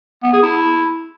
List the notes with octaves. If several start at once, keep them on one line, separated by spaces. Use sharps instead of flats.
B3
G#4
E4